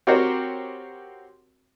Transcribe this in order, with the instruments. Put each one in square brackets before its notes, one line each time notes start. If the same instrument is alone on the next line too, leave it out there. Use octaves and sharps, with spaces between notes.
[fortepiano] C4 F#4 G4 A#4 C5 C#5